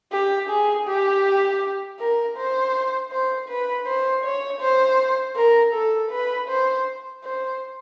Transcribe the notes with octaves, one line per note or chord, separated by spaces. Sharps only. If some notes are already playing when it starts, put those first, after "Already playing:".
G4
G#4
G4
A#4
C5
C5
B4
C5
C#5
C5
A#4
A4
B4
C5
C5